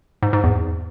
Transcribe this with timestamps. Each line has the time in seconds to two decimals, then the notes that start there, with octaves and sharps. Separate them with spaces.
0.22 G#2
0.33 G#2
0.44 E2